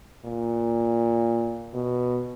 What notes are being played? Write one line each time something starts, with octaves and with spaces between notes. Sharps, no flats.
A#2
B2